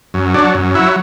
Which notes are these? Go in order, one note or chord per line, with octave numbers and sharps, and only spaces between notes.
F#2
F#3 D4
F#2
F#3 E4